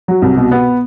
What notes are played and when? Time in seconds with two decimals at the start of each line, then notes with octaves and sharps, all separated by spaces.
0.08 F#3
0.22 C2
0.37 B2
0.51 B3